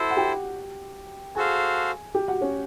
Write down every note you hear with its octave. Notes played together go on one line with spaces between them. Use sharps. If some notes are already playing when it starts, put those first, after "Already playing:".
Already playing: E4 F#4 A4 C5
F#5
G4 G5
F#4 G#4 A4 C5 F5 G#5
G4 G5
F#4 F#5
C#4 C#5